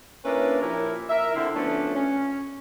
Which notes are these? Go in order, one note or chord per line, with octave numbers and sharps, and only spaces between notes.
A#3 C#4 D4 E4 A#4 B4
A#2 F3 E4 G4 A#4
A#4 E5
D3 C4 E4
F3 A3 B3 C#4 D4
C#4